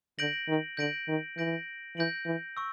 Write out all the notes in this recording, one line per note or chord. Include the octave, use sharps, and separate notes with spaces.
D3 G6 A#6 D7 F#7
D#3
D3 G6 A#6 D7 F#7
D#3
E3 G6 A#6 D7 F#7
E3 G6 A#6 D7 F#7
E3
C#6 E6